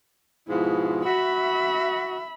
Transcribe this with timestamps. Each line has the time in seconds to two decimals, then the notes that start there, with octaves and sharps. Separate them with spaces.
0.48 G#2 B2 F3 E4
1.04 F#4 E5 B5